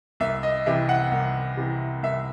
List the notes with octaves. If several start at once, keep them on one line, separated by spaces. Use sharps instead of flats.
C2 E5
D#5
C3 E3 E5
F#5
C2
C3 E3
C2 E5